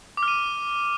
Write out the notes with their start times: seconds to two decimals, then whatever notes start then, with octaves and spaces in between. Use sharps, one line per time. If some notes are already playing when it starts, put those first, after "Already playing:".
0.17 D6
0.23 F6
0.28 D#7